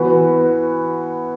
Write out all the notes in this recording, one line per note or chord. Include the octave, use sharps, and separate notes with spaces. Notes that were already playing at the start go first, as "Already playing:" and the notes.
Already playing: E3 B3 F#4 B4